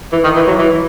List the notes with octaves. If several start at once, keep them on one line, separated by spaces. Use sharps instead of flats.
E3
D#3
E3
F#3
E3